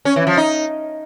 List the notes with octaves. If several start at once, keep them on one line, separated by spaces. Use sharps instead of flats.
C#4
E3
F3
D#4